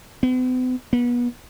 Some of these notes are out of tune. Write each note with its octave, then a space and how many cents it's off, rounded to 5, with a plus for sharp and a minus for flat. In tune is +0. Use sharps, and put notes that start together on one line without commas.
B3 +45
B3 -30